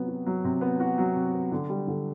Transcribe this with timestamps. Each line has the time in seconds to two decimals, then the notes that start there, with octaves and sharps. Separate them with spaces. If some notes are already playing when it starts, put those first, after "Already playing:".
Already playing: C3 F#3 B3
0.08 F#4
0.26 F#3
0.44 C3
0.61 B3
0.80 F#4
0.98 F#3
1.16 C3
1.34 B3
1.52 D3
1.69 G3
1.87 D3